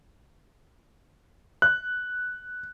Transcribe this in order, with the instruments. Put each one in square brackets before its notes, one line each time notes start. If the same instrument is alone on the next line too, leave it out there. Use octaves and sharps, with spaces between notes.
[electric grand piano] F#6